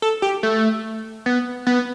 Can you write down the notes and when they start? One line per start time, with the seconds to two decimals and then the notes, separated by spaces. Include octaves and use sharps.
0.02 A4
0.22 G4
0.43 A3
1.26 B3
1.67 B3